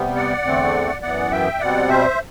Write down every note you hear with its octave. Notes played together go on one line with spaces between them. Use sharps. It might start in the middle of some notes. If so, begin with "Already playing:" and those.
Already playing: C3 G3 B3
D5 F#5
E2 D3 A3 C4
F#2 E3 B3 D5 F#5
E5 G5
B2 G3 C4 D5 F#5
C5 E5